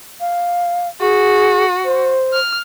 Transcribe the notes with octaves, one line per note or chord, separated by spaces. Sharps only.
F5
F#4 G#4
C5
F6